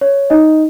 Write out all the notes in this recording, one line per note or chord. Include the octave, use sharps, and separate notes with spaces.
C#5
D#4 D#5